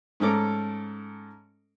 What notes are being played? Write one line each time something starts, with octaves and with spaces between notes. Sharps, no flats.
G#2 A3 C#4 A4 A#5 D6